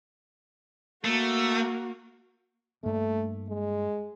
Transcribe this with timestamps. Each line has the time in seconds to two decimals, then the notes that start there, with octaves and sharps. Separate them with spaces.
1.05 A3 A#3 F#4
2.83 G2 A3 A#3
3.49 G#3